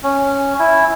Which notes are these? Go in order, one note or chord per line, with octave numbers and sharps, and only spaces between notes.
C#4
E4